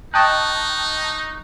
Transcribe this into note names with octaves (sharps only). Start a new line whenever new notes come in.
D#4 D#5 G5 A5 C#6 D#6 F#6